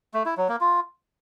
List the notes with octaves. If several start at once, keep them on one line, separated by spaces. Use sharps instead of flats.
A3
E4
F#3
A#3
F4